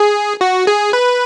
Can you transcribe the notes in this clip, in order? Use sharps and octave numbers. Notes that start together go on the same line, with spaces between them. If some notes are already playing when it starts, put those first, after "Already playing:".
Already playing: G#4
F#4
G#4
B4